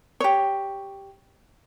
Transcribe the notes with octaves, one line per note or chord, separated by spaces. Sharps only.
G4 C#5